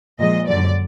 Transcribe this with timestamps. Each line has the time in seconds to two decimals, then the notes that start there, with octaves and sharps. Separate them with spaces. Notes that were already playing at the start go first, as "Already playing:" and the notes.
0.20 A#2 F3 G#3 D#5
0.48 F#2 D3 F#3 D5